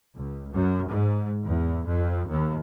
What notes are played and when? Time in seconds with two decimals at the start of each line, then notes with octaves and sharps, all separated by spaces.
0.16 C#2
0.53 F#2
0.91 G#2
1.44 E2
1.85 F2
2.28 D#2